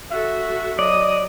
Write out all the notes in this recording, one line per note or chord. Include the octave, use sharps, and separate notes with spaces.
F#4 A4 E5
F#3 D5 D#5 D#6